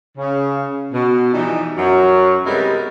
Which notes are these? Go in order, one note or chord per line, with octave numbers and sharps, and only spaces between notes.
C#3
B2
E3 F3 G3 D#4
F#2 F#3
C3 G3 G#3 B3 E4 A#4